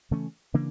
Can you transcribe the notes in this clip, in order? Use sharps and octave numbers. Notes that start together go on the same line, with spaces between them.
C#3 E3 A3 C#4
C#3 E3 A#3 D4